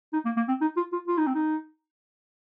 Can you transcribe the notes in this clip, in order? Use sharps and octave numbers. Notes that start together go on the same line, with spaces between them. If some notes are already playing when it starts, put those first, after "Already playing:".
D#4
A#3
A#3
C4
D#4
F4
F4
F4
D#4
C4
D#4